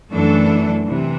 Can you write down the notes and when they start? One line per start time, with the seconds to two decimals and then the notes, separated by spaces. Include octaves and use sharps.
0.12 F#2 E3 A3 D4 A4
0.87 C3 E3